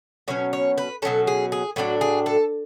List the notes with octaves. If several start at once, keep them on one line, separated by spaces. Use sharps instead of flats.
B2 F#3 C#4 C#5
C#5
B4
B2 F#3 C#4 A4
G#4
G#4
A2 F#3 B3 D4 F#4
G#4
A4